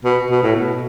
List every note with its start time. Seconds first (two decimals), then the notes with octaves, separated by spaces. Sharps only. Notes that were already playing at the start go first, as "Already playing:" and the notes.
0.05 B2
0.31 B2
0.43 A2
0.56 B2